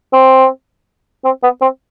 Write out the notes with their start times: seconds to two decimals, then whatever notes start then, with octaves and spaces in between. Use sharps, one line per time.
0.13 C4
1.24 C4
1.43 B3
1.61 C4